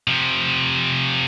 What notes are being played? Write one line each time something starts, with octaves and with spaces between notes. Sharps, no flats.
C3 F3